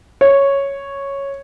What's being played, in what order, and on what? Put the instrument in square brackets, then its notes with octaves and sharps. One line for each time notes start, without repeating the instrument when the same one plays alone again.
[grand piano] C#5